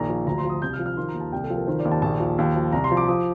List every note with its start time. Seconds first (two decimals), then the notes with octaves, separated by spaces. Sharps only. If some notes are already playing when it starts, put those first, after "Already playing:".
Already playing: A#1 D#3 A#5
0.09 F3
0.26 D2 A#5
0.38 C6
0.44 F3
0.50 D#6
0.62 C2 G6
0.73 F6
0.79 F3
0.86 F6
0.97 D#3 C6
1.09 A#5
1.14 D#2
1.20 A5
1.32 C2 G5
1.44 A4
1.50 F3
1.56 A#4
1.67 D#3 C5
1.80 D5
1.85 D#2
1.92 A5
2.02 A#1 A5
2.20 F3
2.38 D#2
2.55 F3
2.72 C2 A#5
2.84 C6
2.91 F3
2.97 D6
3.08 F3 D#6